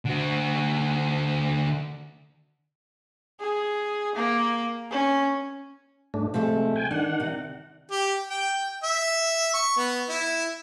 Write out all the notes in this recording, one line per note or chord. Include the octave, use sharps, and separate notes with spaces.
D3 F#4
G#4
A#3
C#4
G#2 A3 D4
C3 F3 G#3 A3
G5 G#5
D#3 D4 F#5
C3
G4
G5
E5
C#6
B3
E4